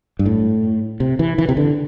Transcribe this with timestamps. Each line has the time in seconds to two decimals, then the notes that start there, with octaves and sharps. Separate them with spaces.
0.19 G2
0.26 A2
1.00 C3
1.19 E3
1.38 E3
1.49 C3
1.57 D3